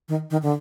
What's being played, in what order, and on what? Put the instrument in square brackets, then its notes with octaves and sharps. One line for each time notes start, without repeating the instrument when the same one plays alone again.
[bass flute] D#3
D#3
D3